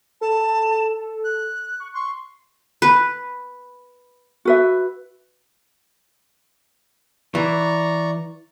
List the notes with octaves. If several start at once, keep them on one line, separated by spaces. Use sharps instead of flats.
A4 A5
F#6
C#6
C6 C#6
B4
F#4 B4 E5
E3 D5 A#5 C#6